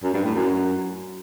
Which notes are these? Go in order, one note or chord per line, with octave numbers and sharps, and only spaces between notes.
F#2
G2
A2
F#2